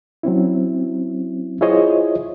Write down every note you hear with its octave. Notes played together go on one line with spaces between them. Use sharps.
F#3 C4 C#4 E4
E4 F4 G#4 C5 C#5 D#5